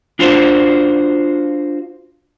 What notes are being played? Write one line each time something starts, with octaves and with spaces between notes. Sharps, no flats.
D4 F4 F#4 C5